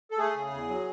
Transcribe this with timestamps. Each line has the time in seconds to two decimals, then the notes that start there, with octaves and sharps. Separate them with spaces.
0.11 A4
0.18 A3 G#4
0.35 C#3
0.52 E2
0.68 F#3